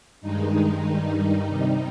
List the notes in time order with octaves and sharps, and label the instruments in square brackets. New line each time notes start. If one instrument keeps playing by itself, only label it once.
[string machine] G2 D#3 G#3 D#4
G2 D#3 G3 D#4
C3 G3